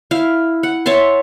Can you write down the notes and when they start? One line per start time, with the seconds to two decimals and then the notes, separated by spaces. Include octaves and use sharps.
0.11 E4 F5
0.63 F#5
0.86 C#5 E5 A5 C6